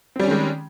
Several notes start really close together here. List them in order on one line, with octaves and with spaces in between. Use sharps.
C4 G3 C#4 D#3 G#3